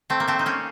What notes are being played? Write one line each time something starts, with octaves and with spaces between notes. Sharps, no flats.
A3 C4
A#3
A3 C4
D#4
A#3 C#4